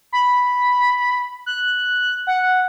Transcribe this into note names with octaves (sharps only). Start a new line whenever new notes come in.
B5
F#6
F#5